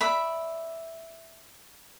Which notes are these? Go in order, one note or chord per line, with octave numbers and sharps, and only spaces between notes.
D5 E5 B5